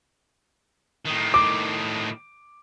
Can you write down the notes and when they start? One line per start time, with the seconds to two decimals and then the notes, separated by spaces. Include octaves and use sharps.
1.05 A2 D#3
1.34 D6